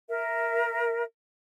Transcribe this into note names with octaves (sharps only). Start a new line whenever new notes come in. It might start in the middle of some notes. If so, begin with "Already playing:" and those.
A#4 E5